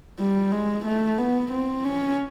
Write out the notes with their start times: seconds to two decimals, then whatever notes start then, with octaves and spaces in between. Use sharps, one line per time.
0.19 G3
0.52 G#3
0.85 A3
1.18 B3
1.52 C4
1.84 C#4